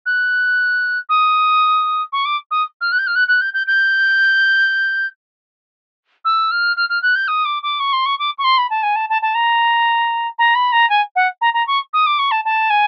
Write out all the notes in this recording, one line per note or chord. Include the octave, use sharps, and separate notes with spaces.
F#6
D#6
C#6
D6
D#6
F6
F#6
G6
F6
F#6
F#6
G6
G6
G6
E6
F6
F6
F6
F#6
G6
D#6
D6
D6
C#6
C6
C#6
D6
C#6
C6
B5
A5
G#5
A5
A5
A5
A#5
A#5
B5
A#5
G#5
F#5
A#5
A#5
C#6
D#6
D6
C#6
A5
A5
G#5